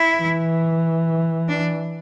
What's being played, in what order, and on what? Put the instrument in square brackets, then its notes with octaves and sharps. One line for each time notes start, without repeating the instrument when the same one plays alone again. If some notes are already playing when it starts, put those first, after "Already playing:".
Already playing: [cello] E4
[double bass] E3
[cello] D4